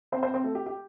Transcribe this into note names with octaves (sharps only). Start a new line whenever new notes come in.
C4 C5
C4 C5
C4 C5
A3 A4
G4
G4